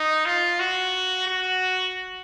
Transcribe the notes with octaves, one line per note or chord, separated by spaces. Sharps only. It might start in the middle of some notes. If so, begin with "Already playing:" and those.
Already playing: D#4
F4
F#4
F#4